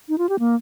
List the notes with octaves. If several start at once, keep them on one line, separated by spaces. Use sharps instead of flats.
D#4
F4
G4
A#3